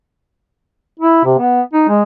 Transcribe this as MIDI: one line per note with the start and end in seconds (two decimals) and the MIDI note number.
1.00 1.24 64
1.25 1.37 48
1.39 1.61 59
1.73 1.84 63
1.89 2.03 56